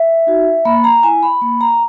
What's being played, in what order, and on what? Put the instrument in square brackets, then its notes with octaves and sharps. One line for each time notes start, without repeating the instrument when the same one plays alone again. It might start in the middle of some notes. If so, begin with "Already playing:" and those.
Already playing: [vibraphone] E5
D#4 F#4
A#3 B5
A#5
E4 G#5
B5
A#3 B5
A#5